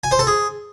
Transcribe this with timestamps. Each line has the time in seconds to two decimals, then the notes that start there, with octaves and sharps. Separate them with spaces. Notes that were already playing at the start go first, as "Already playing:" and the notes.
0.04 G#5
0.11 C5
0.19 A4
0.27 G#4